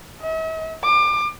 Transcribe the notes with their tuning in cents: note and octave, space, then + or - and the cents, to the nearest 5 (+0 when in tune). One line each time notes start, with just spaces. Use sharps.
E5 -45
D6 +30